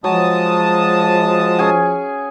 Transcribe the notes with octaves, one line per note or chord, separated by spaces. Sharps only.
F3 F#3 G#3 A5 D#6
C#4 G#4 G#5